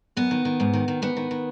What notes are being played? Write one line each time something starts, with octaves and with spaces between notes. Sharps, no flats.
F#2 B3
D#3
D#3
G#2
D#3
D#3
G#2 B3
D#3
D#3